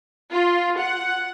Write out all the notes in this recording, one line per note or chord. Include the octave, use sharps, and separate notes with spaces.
F4
F#5